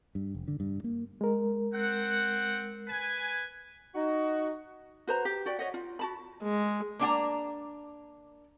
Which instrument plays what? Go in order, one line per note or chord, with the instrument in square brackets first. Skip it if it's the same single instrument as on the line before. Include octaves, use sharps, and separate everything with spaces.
[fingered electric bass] G2
F1
D3
G2
A#3
[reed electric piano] G#3 A#4
[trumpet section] C4 F#5
B4 G#5
[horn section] D#4 F#4
[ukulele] F#4 B4 C5 A#5
G4
F#4 D5 G5
C#5 D#5 F#5
F4
F#4 A5 B5
[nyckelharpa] G#3
[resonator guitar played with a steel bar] A#3 D4 G5 A#5